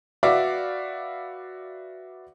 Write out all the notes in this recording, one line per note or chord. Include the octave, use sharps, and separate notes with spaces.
F#4 B4 D5 E5 F5 D6